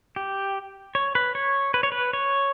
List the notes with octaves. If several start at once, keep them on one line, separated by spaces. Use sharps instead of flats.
G4
C#5
B4
C#5
B4
C#5
B4
C#5